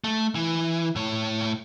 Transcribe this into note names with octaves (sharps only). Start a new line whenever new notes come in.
A3
E3
A2 C#5